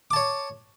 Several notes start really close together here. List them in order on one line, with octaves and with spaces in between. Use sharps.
D6 A5 C#5